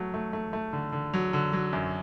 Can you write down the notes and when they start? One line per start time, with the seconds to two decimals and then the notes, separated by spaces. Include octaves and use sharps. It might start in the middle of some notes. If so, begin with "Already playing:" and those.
Already playing: F#3 A3
0.14 A3
0.33 A3
0.53 A3
0.73 D3
0.92 D3
1.14 F#3
1.33 D3
1.53 F#3
1.73 F#2